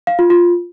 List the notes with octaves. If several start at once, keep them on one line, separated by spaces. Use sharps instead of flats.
F5
F4
F4